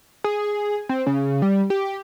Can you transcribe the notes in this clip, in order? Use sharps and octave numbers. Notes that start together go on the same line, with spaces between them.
G#4
C4
C#3
G3
G4